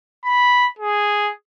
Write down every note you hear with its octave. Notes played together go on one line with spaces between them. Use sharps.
B5
G#4